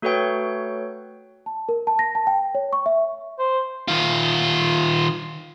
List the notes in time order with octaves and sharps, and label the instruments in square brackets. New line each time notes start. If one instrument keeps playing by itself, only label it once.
[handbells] A3 F#4 A4 B4 C#5 G5
[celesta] A5
A#4
A5
A#6
A5
G5
C#5
C#6
E5
[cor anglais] C5
[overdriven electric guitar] D#3 F4